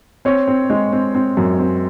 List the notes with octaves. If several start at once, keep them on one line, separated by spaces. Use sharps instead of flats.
C4 C#5
C4
G#3
C4
C4
F#2
C4